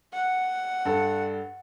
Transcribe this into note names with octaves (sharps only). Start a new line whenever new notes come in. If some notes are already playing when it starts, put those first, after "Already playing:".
F#5
G2 A4